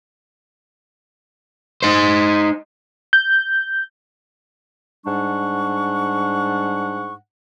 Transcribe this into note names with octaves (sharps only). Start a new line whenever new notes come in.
D#4 C5
G6
G#2 G3 D4 F#5 C#6